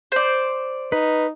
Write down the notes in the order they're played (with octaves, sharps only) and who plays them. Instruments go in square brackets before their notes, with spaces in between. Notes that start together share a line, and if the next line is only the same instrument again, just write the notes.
[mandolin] C5 D5
[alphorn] D#4 [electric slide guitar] B4